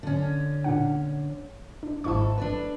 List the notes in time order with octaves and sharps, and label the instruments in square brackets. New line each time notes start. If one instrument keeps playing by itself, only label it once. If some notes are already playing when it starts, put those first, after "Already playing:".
[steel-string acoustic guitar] D3 C#4
[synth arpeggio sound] A#2 D4 F#5
D4
[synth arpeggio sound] G#1 E4 C#6 [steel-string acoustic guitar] G#2 A4
[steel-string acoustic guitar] D4 A4 B4